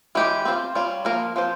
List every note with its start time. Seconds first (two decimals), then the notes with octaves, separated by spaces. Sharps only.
0.15 E3 G#3 C#4 G4
0.45 C4 F4 C5
0.75 G3 C#4 F4
1.05 F3 A#3 F4 A#4
1.36 F3 C4 F4 C5